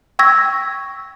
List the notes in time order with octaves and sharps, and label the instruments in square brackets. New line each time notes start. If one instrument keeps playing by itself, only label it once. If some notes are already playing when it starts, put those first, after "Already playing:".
[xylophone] G5 C#6 E6 G#6 A#6 B6